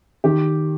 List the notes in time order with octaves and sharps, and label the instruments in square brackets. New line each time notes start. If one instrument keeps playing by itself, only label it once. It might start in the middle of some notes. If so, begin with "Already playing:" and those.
[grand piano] D#3 [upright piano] G4